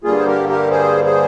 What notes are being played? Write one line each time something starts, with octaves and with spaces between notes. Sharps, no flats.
G2 D3 G3 A#3 F4 G#4
C5
G4 A#4
G4 A#4
G#4 C5
G#4 C5